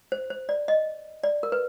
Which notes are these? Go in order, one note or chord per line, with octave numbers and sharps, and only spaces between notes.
C5
C5
D5
D#5
D5
A#4
B4